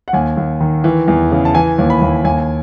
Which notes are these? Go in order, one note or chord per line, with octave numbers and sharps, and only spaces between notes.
F#5
D#2 G#5
D#2
D#3
E3
E2
C#3
A5
E3 G#5
D#2
B5
D#2
D#2 G#5